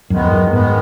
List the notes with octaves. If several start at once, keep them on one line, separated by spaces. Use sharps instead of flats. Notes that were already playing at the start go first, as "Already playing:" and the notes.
F#2 D#3 G#3 B3
F2
F#2
G#2 D#3 G#3 B3